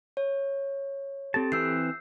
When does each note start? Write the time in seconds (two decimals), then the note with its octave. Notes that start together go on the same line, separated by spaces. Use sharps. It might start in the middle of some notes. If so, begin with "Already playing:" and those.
0.17 C#5
1.34 C4 G4 A4 A5
1.52 E3 C4 B4 E6 G6 C7